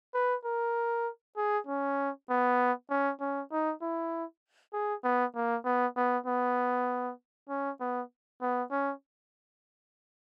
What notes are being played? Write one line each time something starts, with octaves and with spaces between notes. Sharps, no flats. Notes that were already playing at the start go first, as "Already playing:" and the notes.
B4
A#4
G#4
C#4
B3
C#4
C#4
D#4
E4
G#4
B3
A#3
B3
B3
B3
C#4
B3
B3
C#4